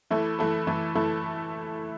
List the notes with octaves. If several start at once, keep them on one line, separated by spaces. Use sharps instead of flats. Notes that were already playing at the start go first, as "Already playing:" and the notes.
E3 A3 E4 A4
E3 A3 E4 A4
E3 A3 E4 A4
E3 A3 E4 A4